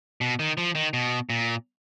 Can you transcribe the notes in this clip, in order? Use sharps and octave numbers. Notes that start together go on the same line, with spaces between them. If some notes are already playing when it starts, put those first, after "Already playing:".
B2
D#3
F3
D#3
B2
A#2